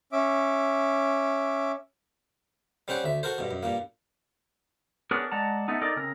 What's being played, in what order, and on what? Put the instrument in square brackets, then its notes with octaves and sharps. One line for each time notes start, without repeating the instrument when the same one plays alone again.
[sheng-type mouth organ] C#4 E5 D6
[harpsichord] G3 C4 C#4 C5 F#5
D2 E5
F#4 A4 A#4 C5
G2 B2
F#2
G2 A#2 A#3
[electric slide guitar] B3 D4 G#4 A#4 B4 C#5
G#3 D5 F#5 A5 A#5
A3 B3 D#4
D#4 A4 A#4 D5
C#3 C4 A#4